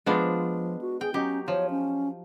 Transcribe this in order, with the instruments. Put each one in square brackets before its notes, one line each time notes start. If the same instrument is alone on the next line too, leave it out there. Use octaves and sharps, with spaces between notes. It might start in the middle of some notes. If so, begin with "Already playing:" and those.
[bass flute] F3 [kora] G#3 B3 F4 [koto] D4 C5 D5
[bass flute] F#4
[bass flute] G#4 [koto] G5
[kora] F#3 D#4 [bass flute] C#4 [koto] G4
[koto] F3 [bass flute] C#5
[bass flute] C#4